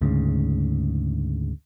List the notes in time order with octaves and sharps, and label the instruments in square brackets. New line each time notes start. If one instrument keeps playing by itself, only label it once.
[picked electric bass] D2 G#2 C#3